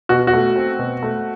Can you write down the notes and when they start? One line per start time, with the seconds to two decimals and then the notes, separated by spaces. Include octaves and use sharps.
0.09 B2 F#4
0.27 F#4
0.33 A3
0.56 C4
0.79 B2
1.03 A3